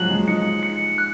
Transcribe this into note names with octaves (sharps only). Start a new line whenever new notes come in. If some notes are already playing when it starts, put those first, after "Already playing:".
Already playing: F3 F#3 G#3 F#6 F#7
G#3
D#4 C#7
C#7
F#6